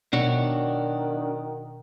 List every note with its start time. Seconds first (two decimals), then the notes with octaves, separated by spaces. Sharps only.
0.13 B2 D#3 D4 F#4 C#5